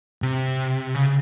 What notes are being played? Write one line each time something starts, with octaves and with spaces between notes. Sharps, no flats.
C3
C#3